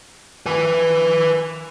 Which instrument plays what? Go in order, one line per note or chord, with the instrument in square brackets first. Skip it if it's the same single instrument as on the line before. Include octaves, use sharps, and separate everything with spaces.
[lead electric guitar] B4 G#5